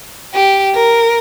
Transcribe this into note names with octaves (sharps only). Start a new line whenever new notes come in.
G4
A#4